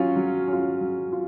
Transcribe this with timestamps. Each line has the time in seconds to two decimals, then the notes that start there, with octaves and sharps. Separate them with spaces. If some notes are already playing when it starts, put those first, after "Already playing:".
Already playing: F#3 C#4 F4
0.16 F#3
0.48 C#4 F4
0.81 F#3
1.12 F4